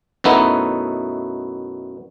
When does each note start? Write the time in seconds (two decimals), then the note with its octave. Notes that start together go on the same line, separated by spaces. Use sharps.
0.24 F#2 B2 A3 B3 D#4 E4